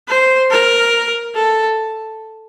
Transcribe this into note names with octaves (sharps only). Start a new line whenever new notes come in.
C5
A#4
A4